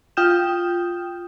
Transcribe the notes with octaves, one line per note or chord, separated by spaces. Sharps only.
F4 G5 D#6 F6 G6 E7